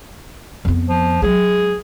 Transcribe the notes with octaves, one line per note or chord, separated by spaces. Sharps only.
F2 B3
F3
F#3 G#3 G#4